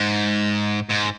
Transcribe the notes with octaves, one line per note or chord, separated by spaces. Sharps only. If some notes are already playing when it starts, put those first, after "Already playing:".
Already playing: G#2
G#2